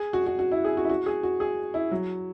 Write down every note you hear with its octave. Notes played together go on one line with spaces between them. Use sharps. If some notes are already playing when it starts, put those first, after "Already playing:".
Already playing: G#4
F#4
F#4
F#4
E4
G#4
F#4
E4
F#4
G#4
F#4
G#4
E4
F#3